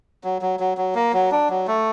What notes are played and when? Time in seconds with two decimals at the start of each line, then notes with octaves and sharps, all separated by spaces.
0.24 F#3
0.42 F#3
0.60 F#3
0.77 F#3
0.95 A#3
1.13 F#3
1.31 D4
1.50 F#3
1.67 A3